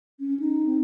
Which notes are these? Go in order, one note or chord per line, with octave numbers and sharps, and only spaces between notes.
C#4
D#4
C4